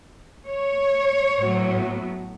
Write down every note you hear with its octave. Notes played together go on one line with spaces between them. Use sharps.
C#5
A2 F#3 B3